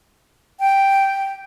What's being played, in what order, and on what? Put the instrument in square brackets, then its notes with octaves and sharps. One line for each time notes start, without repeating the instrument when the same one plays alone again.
[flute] G5